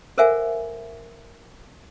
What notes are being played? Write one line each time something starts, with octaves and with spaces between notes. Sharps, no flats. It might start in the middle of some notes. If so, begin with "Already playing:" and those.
A4 A#4 C5 E5 F#5 G#5